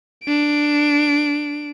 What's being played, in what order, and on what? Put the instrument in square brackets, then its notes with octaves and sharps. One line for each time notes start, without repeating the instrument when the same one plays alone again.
[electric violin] D4 D7